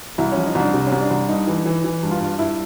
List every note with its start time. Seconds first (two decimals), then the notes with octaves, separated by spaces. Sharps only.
0.18 C2 E4
0.32 F3 C#4
0.46 D#4
0.55 C2 D4
0.74 C3 D4
0.87 C#4
0.92 C2
1.00 D4
1.11 C2
1.29 G2 D#4
1.47 E3
1.66 E3
1.84 E3
2.03 G2
2.11 F4
2.20 G2
2.39 G2 E4